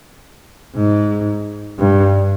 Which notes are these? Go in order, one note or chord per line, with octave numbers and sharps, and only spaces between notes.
G#2
G2